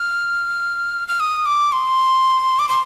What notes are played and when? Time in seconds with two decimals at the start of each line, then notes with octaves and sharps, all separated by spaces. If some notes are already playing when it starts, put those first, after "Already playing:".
Already playing: F6
1.08 F6
1.20 D#6
1.46 D6
1.72 C6
2.59 D6
2.69 C6